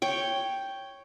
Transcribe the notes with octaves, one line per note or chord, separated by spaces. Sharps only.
C#5 G5